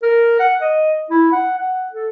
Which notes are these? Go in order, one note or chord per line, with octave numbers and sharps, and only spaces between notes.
A#4
F#5
D#5
E4
F#5
F#5
A4